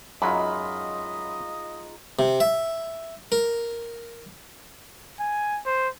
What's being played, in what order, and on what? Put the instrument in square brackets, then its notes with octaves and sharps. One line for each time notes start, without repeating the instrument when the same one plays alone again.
[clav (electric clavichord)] F#2 F#3 [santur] G#3 D#4 F4 [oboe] D#5 [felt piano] B5
[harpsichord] C3
E5
A#4
[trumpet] G#5
C5